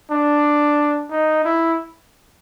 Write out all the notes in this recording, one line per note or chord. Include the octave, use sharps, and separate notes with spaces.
D4
D#4
E4